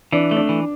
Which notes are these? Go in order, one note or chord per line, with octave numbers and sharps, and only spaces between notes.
E3 D4
A3
D4
E3